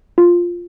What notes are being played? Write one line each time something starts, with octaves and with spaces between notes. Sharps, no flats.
F4